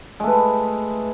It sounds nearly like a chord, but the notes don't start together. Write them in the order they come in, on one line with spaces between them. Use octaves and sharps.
G#3 A3 B4